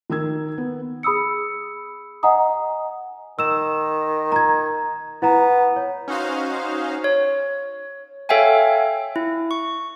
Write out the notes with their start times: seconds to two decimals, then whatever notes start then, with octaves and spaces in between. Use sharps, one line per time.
0.10 D#3 A#4 E6 G#6
0.58 B3
1.03 G#4 B5 D#6 E6 C#7
2.23 D#5 F#5 G#5 A#5 D#6
3.39 D#3 E6 E7
4.32 A#5 G#6
5.22 B3 E4 A#5
5.76 C#5
6.08 C#4 D#4 F#4 C5 F5
7.04 C#5
8.29 A4 C#5 E5 F5 G5 G#5
9.16 E4
9.51 C#6